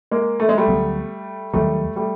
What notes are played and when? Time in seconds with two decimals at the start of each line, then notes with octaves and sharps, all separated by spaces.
0.11 G#3 A#3
0.40 A3
0.49 G#3
0.58 G3 A3
0.68 D2 D3 F#3 B3
1.53 D#2 D#3 F#3 G3 A3
1.96 G3 A3